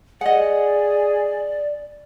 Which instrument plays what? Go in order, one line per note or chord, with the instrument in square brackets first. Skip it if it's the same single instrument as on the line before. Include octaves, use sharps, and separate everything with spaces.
[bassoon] G#4 [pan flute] D5 [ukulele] D#5 F#5